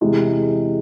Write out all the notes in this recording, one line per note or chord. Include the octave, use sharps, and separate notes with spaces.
E2 C3 E3 G#3 E4